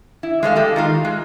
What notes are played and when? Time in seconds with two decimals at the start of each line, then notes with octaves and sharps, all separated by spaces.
0.23 E4
0.43 G#3 A3 C#5 F5
0.56 G#3 G4 A4
0.76 D#3 D#4 F4
1.05 G#3